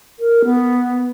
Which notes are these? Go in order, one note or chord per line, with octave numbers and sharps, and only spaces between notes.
A#4
B3